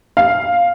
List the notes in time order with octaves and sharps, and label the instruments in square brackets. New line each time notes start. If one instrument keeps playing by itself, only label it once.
[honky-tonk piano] F5